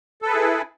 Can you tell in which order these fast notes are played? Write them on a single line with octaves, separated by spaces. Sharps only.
A4 B4 G#4 E4